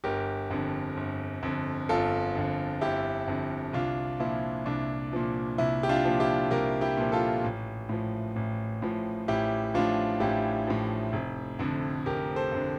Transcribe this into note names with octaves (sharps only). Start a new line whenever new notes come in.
G1 G4 A#4
F2 D3
G1
F2 D3
G1 F4 A4
F2 D3
G1 E4 G4
F2 D3
C2 D4 F4
A#2 F3 E4
C2 D4
A#2 F3
C2 E4
G4
D4 F4
A#2 F3
E4 G4
C2 G4 A#4
E4 G4
A#2 F3
F4 A4
A1
A2 F3
A1
A2 F3
A1 E4 G4
A2 F3 D4 F4
A1 E4 G4
A2 F3
F1
F2 D3
F1 G4 A#4
A4 C5
F2 D3